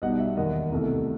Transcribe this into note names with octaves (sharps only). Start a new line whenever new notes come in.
B1 B2 G3 D#4 D#5 F#5
E5
E1 D#2 D#3 D#5 F#5
C2 B2 A3